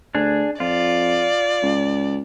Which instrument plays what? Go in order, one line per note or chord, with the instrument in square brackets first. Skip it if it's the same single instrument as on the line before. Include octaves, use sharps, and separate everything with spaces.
[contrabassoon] D2 [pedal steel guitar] D4 G#4
[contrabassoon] F2 [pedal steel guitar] F4 [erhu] D5
[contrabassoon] C#2